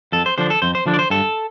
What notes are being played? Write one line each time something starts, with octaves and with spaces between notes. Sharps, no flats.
F2 A4
C5
D3 F3 D4 C5
A4
F2 C5
C5
D3 F3 D4
D5
C5
G2 A4